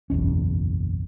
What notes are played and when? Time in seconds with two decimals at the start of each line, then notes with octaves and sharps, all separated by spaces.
0.10 F#1 B1 E2 C#4